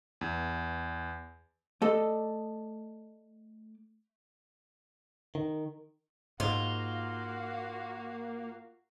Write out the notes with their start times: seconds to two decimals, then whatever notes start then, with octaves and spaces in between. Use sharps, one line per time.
0.21 E2
1.82 A3 A4 D5 D#5
5.35 D#3
6.40 G#2 A#3 F4 F#4 F5